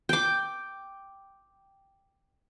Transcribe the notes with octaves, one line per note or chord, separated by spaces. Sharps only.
G5 D6